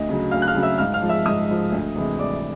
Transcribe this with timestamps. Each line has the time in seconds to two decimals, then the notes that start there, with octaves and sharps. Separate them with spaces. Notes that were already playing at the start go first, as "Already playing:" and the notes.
Already playing: D2 D#5
0.09 C#3 F#3
0.31 D2 F5 F6
0.42 F#6
0.47 F5 F6
0.55 C#3 F#3
0.63 E5 E6
0.78 G#2 F5 F6
0.94 F5 F6
1.02 F3 G#3
1.09 E5 E6
1.25 G#2 D#5 D#6
1.49 F3 G#3
1.72 D2
1.96 C3 E3 G#3
2.19 D2 D5 D6